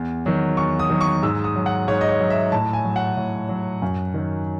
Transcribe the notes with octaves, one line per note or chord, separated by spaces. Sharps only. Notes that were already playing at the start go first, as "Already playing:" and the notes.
Already playing: E2
D#3 F#3
E2 C#6
D#6
D#3 F#3
C#6
G#2 E6
D#6
F#3
F#5
G#2 C#5
D#5
C#5
F#3
E5
A2 A5
G#5
F#3
F#5
A2
F#3
F#2
D#3 F#3